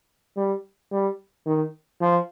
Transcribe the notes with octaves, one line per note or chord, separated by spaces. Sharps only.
G3
G3
D#3
F3